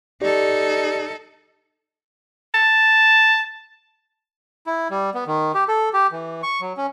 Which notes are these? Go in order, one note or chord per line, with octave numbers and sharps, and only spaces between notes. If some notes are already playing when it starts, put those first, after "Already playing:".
D#4 G4 A4 D5
A5
E4
G3
B3
D#3
G4
A4
G4
E3
C#6
F#3
C#4